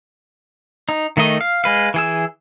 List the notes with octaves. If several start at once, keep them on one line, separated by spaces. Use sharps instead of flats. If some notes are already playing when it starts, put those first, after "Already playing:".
D#4
D#3 A3 D#4 D#5
F5
G#3 B4 F5
E3 G#4 E6